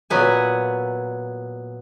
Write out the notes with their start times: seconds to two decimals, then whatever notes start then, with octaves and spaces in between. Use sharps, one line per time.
0.10 A#2 F#3 B3 G#5